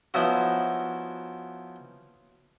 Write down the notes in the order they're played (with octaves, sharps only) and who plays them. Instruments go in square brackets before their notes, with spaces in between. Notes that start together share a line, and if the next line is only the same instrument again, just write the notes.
[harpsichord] F3 B3 C#4 D#4 E4 F#4